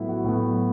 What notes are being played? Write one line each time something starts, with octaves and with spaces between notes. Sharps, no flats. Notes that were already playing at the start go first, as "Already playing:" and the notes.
Already playing: A2 F#3 B3 E4
F#4
A2 F#3 B3